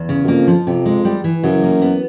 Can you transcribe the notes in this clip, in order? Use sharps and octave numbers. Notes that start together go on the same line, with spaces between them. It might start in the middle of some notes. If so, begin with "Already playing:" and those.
Already playing: E2
C#3
F#2
F2 A#3
F3
F2 C3
G#3
G3
E3
F#2 C#3
A#3
B3